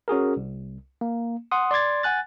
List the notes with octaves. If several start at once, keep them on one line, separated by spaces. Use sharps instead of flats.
C#4 F#4 G#4 A#4
C2
A#3
F#5 C6 D#6
D5 C6 D6 G#6 A6
F#5 G#5 F#6 A6